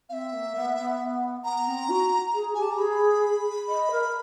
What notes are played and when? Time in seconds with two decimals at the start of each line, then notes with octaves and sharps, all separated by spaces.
0.09 C4 E5 F5
0.32 A#3
0.55 B3
0.77 B3
1.44 B3 A#5
1.66 C4
1.89 F#4
2.34 G#4
2.54 G4 G#5
2.62 A5
2.71 A#5
2.78 G#4 B5
3.68 D#5
3.91 A#4